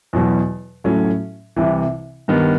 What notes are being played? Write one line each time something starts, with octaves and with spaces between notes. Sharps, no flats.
E2 B2 F#3
A2 F#3 A3 C#4
C2 C3 E3
G2 D#3 G3 B3